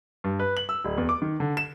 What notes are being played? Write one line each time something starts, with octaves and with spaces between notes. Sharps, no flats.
G2
B4
F#7
E6
D1
E2
D6
D#3
D3
E7